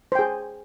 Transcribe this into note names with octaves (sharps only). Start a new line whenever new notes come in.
G#4 C5 G5